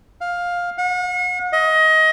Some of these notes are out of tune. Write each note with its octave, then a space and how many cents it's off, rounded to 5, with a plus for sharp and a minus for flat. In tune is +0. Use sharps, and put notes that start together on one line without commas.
F5 +10
F#5 -40
D#5 +25